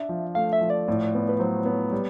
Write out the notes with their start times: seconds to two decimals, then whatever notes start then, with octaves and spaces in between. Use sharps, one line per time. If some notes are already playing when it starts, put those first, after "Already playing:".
Already playing: D4 E5
0.09 F3
0.35 A3 F5
0.53 E5
0.61 F3
0.70 D5
0.88 A2
1.14 B3
1.29 B4
1.39 F#3 C5
1.65 B3 C#5
1.92 G3